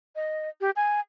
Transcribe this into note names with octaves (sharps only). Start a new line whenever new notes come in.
D#5
G4
G#5